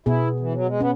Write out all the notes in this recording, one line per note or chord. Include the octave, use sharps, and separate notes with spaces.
B2 B3 E4 G#4
E3
F#3
G#3
B3 C#4